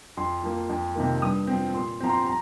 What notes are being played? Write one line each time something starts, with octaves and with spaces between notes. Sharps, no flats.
F2 C6
F3 A#3
F2
C3 D#3 A#3
G2 D#6
F3 C4
A#2 C6
F3 C4 A#5
C6
A#5